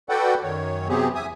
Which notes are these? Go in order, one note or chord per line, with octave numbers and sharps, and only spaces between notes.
F#4 A4 B4 D5 F#5 G5
F#2 D#3 C#5
C3 F#3 B3 C4 G4 G#4
E2 E5 G#5 D#6